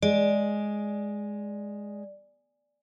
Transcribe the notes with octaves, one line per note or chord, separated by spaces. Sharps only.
G#3 D5